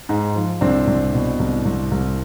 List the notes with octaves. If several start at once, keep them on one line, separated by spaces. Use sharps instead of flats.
G#2
F3
C2 C4 D4
C2
B2
C2
C2
C2